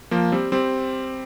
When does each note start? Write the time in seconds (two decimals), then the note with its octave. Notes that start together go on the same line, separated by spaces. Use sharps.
0.11 F3 A#3
0.32 G3 C4
0.52 G3 C4